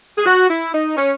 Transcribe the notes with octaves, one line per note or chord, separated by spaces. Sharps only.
G#4
F#4
E4
D#4
C#4